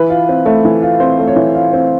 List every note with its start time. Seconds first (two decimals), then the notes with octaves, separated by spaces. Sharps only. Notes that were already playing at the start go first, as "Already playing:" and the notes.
Already playing: E3 B4
0.10 F4
0.29 C4
0.46 A3
0.65 E3
0.82 F4
1.00 C4 C5
1.19 A3
1.27 C#5
1.36 E3
1.54 F4 F5
1.73 C4